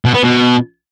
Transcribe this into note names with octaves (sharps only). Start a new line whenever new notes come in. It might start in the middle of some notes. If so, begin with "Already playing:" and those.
B2
B3
B2